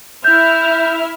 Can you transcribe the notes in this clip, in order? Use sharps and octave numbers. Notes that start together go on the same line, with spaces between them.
E4 E5 F6 G6